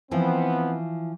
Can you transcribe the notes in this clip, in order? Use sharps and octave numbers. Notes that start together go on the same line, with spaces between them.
E3 F3 B3 C4